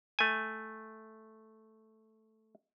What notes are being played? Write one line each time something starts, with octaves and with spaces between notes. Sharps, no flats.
A3 G#5